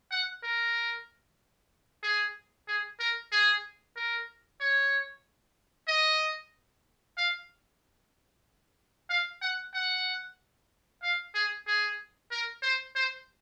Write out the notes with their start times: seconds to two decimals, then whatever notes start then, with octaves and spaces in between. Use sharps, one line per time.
0.11 F#5
0.43 A#4
2.03 G#4
2.67 G#4
3.00 A#4
3.32 G#4
3.96 A#4
4.60 C#5
5.88 D#5
7.17 F5
9.10 F5
9.41 F#5
9.74 F#5
11.03 F5
11.34 G#4
11.67 G#4
12.31 A#4
12.63 C5
12.95 C5